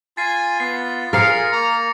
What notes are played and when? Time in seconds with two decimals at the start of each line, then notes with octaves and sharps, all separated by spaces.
0.17 F4 G#5 A6 C7
0.60 B3 C7
1.13 G#4 A#4 F5 A#6 C#7
1.52 A#3 A#5